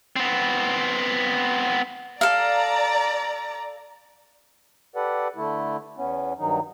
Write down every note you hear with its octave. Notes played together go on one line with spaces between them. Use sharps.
B3 C4
A4 D5 F5 A#5
G4 A4 B4 D5 F#5
D3 A3 E4
E2 B3 C#4
G2 D#3 F#3 D#4